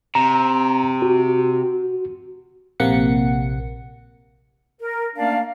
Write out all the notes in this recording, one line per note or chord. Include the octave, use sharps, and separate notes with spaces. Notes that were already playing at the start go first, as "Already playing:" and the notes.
C3 A#5
F#4
A#1 C3 A#3 F#5 C#7
A#4
A3 A#3 C#4 D4 D5 F5